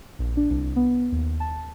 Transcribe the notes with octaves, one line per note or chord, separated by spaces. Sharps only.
A#1
D4
C2
B3
D#2
A5